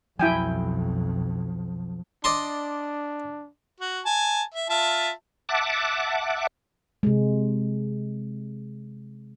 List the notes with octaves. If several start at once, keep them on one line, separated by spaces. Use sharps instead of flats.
B1 F2 F3 F#3 E4 G5 G#5
D4 D5 D#5 C6
F#4
G#5 A5
E5
F4 E5 A5
E5 F#5 A5 D6
C3 G#3